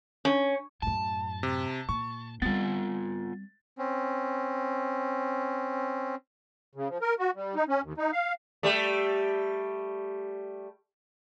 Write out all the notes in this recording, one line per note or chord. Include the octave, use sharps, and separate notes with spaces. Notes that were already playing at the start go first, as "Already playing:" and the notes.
C#4
F#2 A2 A5
C3
A#2 C#6
G3 B3 C4 F4 A6
C4 C#4
C#3
F3
A#4
F#4
G3
D#4
C#4
D#2
D#4
F5
G3 A3